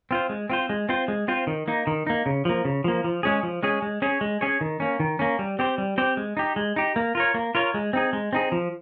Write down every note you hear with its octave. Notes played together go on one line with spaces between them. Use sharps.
C4 F4 C5
G#3
C4 F4 C5
G#3
C4 F4 C5
G#3
C4 F4 C5
D#3
A#3 D#4
D#3
A#3 D#4
C#3
F3 A#3
C#3
F3 A#3
F3
G#3 C#4 G#4
F3
G#3 C#4 G#4
G#3
C#4 G#4 C#5
G#3
C#4 G#4 C#5
D#3
A#3 C#4
D#3
A#3 C#4
G3
C4 G4 C5
G3
C4 G4 C5
G#3
D#4 G4
G#3
D#4 G4
A#3
F4 A#4 C#5
A#3
F4 A#4 C#5
G#3
C4 D#4 G#4
G#3
C4 D#4 G#4
F3